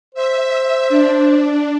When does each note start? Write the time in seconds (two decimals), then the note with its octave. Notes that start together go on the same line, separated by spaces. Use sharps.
0.14 C5 E5
0.89 D4